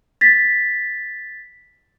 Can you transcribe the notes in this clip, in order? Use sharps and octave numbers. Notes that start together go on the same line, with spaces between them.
A6 B6